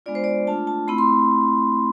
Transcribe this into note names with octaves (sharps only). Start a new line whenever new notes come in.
G#3 B3 D4 F4 D5
C5
D5
A3 D4 F4 A5
A5
A3 C4 E4 B5
C6